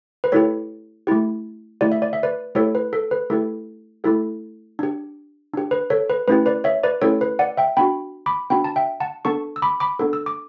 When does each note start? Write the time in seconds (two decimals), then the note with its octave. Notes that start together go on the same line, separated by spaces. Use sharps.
0.24 B4
0.32 A3 E4 G4 A4 C#5
1.07 A3 E4 G4
1.81 A3 E4 G4 D5
1.92 E5
2.02 D5
2.13 E5
2.23 B4 D5
2.55 A3 E4 G4 A4 C#5
2.75 B4
2.93 A4
3.11 B4
3.30 A3 E4 G4 A4
4.04 A3 E4 G4 A4
4.79 D4 G4
5.53 D4 G4
5.71 B4
5.90 A4 C#5
6.10 B4
6.28 A3 C#4 E4 G4 B4
6.46 B4 D5
6.64 C#5 E5
6.83 B4 D5
7.02 A3 C#4 E4 G4 A4 C#5
7.21 B4
7.39 D5 F#5
7.57 E5 G5
7.77 B3 D4 F#4 G5 B5
8.26 B5 D6
8.50 B3 D4 F#4 G5 B5
8.64 A5
8.76 E5 G5
9.00 F#5 A5
9.25 B3 D4 A4 A5 C#6
9.56 E6
9.62 B5 D6
9.80 B5 D6
9.99 B3 D4 A4
10.13 E6
10.26 D6